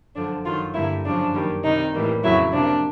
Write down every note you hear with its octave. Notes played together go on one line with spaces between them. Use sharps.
F#2 D3 F3 D4
F#2 D#3 F#3 F4
G2 D3 G3 A#3 E4
F#2 C#3 F3 D4
F#2 D#3 G3 A#3
C3 D#3 G3 D#4
A2 E3 G3 A#3
F2 C#3 F#3 E4
C3 F3 A#3 D4